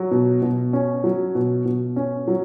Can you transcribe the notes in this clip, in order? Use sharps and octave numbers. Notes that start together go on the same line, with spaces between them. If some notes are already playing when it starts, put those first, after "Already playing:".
Already playing: F#3
B2
B2
C#4
F#3
B2
B2
C#4
F#3